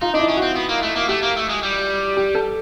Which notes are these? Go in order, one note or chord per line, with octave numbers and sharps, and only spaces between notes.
D#4 F4
D4 D#4
E4
C#4
F#4
C4
B3
A#3
A3
A#3
A3 G4
A#3
A3
G#3
G3
G4
A4